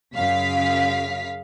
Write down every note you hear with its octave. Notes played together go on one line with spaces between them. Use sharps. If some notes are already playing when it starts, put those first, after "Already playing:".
F#2 C#3 F5 B6